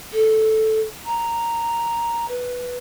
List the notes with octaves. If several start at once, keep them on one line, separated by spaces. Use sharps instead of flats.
A4
A#5
B4